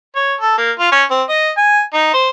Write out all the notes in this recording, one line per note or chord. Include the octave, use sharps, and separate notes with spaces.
C#5
A4
A#3
F4
C#4
C4
D#5
G#5
D#4
C5